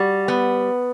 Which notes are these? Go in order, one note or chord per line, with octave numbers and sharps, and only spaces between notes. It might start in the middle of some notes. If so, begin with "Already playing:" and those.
Already playing: G3 F#4
B3